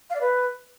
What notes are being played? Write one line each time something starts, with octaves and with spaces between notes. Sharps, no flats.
F5
D5
B4